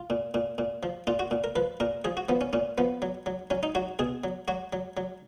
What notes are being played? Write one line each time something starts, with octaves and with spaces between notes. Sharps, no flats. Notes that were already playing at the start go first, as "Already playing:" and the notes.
Already playing: F4
A#2
A#2
A#2
F3
A#2 F4
F#4
A#2
A#4
F3 B4
A#2 A#4
F3 G#4
F#4
F3 B3
C#4
A#2 C#4
F3 B3
F#3
F#3
F#3 C#4
D#4
F#3 F#4
B2 G#4
F#3
F#3 F#4
F#3
F#3